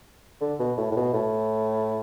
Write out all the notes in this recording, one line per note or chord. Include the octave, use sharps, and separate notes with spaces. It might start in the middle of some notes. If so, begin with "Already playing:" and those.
D3
B2
A2
A2
B2
A2